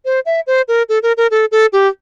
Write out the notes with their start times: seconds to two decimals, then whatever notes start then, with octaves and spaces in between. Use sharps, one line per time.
0.05 C5
0.26 E5
0.47 C5
0.68 A#4
0.89 A4
1.03 A#4
1.17 A#4
1.31 A4
1.52 A4
1.73 G4